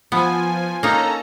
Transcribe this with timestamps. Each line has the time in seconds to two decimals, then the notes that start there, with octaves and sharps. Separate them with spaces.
0.12 F3 B3 G#5
0.83 A#3 C#4 D#4 A4 A#5